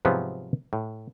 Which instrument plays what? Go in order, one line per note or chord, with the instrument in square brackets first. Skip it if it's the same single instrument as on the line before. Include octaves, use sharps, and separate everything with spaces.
[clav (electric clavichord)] G#2 C3 F3 F#3 B3
A2